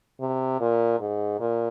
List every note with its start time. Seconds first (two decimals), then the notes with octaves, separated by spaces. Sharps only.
0.20 C3
0.60 A#2
1.00 G#2
1.40 A#2